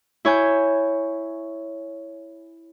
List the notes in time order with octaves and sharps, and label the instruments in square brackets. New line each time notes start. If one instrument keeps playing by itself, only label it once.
[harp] E4 C#5 G#5 G6